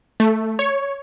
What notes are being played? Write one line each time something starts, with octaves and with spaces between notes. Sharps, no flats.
A3
C#5